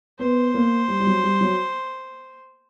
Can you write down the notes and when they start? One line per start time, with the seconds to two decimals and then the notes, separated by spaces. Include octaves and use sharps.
0.19 B3 C5
0.54 A#3
0.88 G3
1.00 G3
1.07 F#3
1.23 G3
1.41 F#3